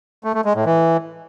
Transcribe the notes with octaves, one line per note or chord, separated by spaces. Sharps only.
A3
A3
G#3
A2
E3